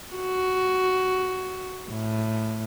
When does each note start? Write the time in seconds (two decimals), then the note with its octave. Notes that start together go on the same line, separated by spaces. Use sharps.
0.15 F#4
1.91 A2